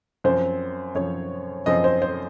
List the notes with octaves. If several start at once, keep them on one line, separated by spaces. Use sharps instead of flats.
F#2 F3 C4 C5
F#2 F3 C4 C#5
F#2 F3 C4 D#5
C5
C5